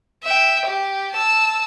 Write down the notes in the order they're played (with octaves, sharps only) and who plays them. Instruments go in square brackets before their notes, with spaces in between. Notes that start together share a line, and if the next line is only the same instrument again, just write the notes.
[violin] E5 G5
G4
A5 E6